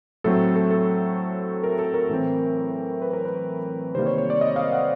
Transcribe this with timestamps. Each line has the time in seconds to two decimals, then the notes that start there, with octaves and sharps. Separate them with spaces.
0.24 A2 F#3 A3 C4 A4
0.56 A4
0.71 A4
1.64 A#4
1.79 A4
1.94 A#4
2.09 A2 E3 A3 C4
3.02 B4
3.13 A#4
3.25 B4
3.95 C3 D#3 G3 A#3 C5
4.06 C#5
4.18 C#5
4.30 D5
4.41 D#5
4.56 F5
4.72 F#5